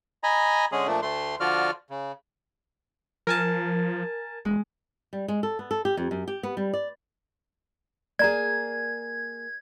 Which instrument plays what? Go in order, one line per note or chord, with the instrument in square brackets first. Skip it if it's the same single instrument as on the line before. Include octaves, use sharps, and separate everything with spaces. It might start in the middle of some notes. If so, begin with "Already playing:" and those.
[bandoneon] D#5 G#5 A#5 B5
D3 G#3 C#4 G#4
A#2 F3 A3 D4
D2 A3 C6
D3 F3 F4 F#4 D5 F6
C#3
[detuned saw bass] F3 [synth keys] A#4 G#5 A5
[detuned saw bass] E1 [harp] G#3
[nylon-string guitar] G3
G#3
A4
B3
A4
G4
F2
F#2
G4
B3
G3
D5
[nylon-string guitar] A#3 G#4 [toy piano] D5 A#5 [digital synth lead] G#6